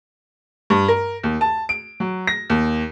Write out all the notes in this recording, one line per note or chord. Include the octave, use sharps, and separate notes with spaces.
G2
A#4
D#2
A5
D7
F#3
A#6
D#2